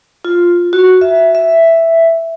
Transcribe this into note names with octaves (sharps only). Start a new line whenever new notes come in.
F4
F#4
E5
E5